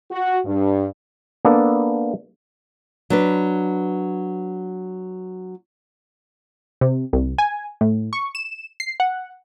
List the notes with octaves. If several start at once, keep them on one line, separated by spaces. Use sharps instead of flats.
F#4
G2
A#3 B3 D4 A4
F#3 D4 B4
C3
C2
G#5
A2
C#6
E7
C7
F#5